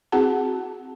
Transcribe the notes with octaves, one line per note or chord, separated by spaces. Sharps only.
C4 E4 F#4 G#4 F#5 A5